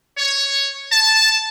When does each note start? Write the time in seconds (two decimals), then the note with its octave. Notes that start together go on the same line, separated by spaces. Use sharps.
0.18 C#5
0.92 A5